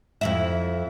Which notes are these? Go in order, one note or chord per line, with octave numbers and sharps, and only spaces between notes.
F2 E4 E5